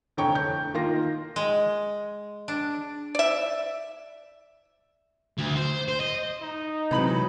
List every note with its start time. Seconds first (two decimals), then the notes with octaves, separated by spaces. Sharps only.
0.17 F1 D3 C#5 G5 A#5 C#6
0.35 G6
0.74 D#3 A#3 F4 C6 A#6
1.36 G#3
2.48 D4
3.15 D5 E5
5.38 D2
5.56 C5
5.88 C5
6.00 D#5
6.42 D#4
6.91 C3 E3 F#3 G#3 C4 B5 F#7